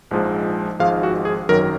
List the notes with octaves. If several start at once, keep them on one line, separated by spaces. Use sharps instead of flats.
A#1 G#2 F3 G#3
G#1 G#2 F3 G#3 F5
F#4
G#4
G#1 F#2 D#3 F#3 A#4